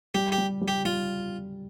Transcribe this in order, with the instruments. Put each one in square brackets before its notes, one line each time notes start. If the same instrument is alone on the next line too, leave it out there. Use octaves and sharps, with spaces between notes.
[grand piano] G3 [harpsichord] G4
[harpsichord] G4
[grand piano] G3
G3
[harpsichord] G4
[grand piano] G3 [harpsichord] F4